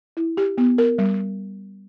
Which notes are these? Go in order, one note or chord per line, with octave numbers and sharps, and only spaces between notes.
E4
G4
B3
A#4
G3